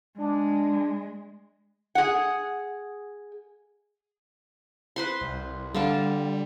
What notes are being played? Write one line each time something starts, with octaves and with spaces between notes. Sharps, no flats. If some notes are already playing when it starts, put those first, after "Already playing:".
G#3 D4
G#4 F#5
B4 C5 C6
C2
D3 G3 F5 A5